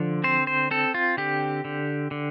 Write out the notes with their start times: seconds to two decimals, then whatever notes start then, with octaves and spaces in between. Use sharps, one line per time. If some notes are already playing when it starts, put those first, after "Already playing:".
Already playing: D3 F3
0.24 C4 C5
0.47 C5
0.71 C4 A4
0.94 F4
1.17 D3 G4
1.65 D3
2.11 D3